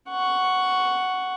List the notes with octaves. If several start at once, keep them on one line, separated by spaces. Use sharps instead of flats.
F#5 C#6